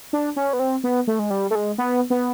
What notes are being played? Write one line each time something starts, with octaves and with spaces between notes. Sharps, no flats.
D4
C#4
B3
C4
B3
A3
G#3
G3
A3
G#3
B3
B3